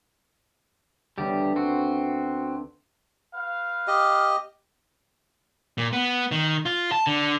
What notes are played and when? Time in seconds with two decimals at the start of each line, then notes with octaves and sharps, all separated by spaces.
1.18 D2 G3 B3 G4
1.56 C4 F#4
3.35 B4 F5
3.87 G4 D#5
5.78 A#2
5.93 B3
6.31 D#3
6.65 F4
6.92 A5
7.07 D3